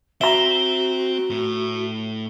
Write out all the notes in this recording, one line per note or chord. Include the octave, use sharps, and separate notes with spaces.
C4 F#4 E5 A#5 G7
A2